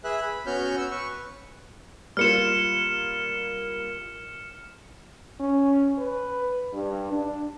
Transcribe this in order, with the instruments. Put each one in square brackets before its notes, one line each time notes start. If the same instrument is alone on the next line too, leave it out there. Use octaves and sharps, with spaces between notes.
[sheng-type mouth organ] G#4 B4 E5 F#6
B5
B3 C#4 F#4 C#5 F6 G6
E6
B4 C#6
[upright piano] G3 A#3 F4 [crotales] F6 C#7 E7
[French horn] C#4
B4
G2
D4